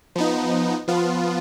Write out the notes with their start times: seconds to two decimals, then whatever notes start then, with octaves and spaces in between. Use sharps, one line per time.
0.16 F3 B3 D#4
0.88 F3 B3 F4